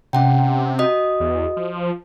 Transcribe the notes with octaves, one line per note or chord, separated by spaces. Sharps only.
C3 C#4 F#5 G5
F#4 D#5 D#6
E2
F3